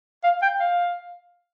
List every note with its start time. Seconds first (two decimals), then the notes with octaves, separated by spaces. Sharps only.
0.24 F5
0.42 G5
0.60 F5